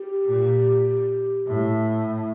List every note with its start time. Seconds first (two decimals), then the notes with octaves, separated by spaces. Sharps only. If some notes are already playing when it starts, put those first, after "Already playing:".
Already playing: G4
0.27 A#2
1.47 A2